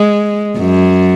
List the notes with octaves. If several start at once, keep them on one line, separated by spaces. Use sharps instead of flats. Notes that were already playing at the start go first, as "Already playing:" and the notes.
Already playing: G#3
F#2